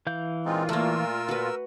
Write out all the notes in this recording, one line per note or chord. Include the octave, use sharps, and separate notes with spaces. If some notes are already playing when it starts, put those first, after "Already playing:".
E3 F5 G6
A#2 G#3 C4 D#4 F4
A3 A#3 A#4 E6
F#4 B4